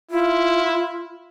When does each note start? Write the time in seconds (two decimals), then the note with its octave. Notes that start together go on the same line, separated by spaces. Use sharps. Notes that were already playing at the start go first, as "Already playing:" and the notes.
0.11 E4 F4